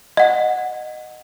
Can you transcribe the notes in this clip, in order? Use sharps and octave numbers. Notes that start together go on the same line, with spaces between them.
D#5 F#5